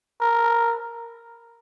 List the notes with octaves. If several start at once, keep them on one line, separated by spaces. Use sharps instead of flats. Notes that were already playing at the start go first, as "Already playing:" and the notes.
A#4